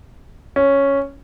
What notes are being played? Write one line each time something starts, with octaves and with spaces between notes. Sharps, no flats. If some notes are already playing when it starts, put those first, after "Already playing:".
C#4